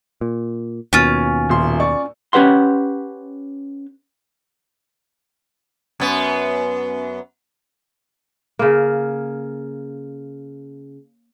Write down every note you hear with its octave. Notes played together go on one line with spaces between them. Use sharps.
A#2
D#2 B2 C#4 F4
D#1 C6
D5 C#6
C#4 G4 B4 F#5 C6
F#2 B3
C#3 A#3